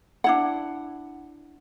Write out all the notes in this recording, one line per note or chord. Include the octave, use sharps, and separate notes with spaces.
D4 E4 F#5